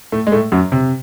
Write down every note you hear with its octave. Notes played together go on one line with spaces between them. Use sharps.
A2 A3
G#3
A2 A3
F#2 F#3
C3